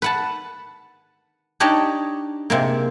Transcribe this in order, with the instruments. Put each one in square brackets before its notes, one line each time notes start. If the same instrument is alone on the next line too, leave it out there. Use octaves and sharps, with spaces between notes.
[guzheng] B4 F#5 A5
D4 D#4 G4 C#5 D#5 A5
C3 G#3 A#3